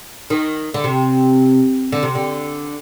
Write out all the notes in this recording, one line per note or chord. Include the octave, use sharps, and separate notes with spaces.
D#3
D3
C3
D3
C3
D3